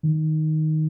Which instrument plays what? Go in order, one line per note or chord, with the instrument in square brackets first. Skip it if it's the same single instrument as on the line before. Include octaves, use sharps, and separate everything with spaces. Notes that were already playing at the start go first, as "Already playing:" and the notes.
[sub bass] D#3